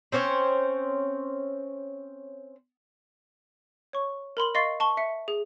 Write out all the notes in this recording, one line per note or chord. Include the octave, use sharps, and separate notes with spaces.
C4 C#4 C5 C#5
C#5 C#6
A#4 B5 C6 F#7
D#5 F5 C6 C#6 A6 C7
A5 C#6 G7
E5 C#7
G#4